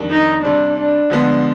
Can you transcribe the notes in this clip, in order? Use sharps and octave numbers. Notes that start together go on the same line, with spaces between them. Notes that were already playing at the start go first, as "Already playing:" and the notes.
Already playing: F2 D#3 G3 D4
D#4
C3 G3 C4 D4
D4
D3 F3 G#3 B3